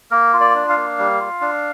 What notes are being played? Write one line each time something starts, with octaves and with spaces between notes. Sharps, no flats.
A#3 A#4
F4
D5
D4
F5
A#3
G3
F4
D4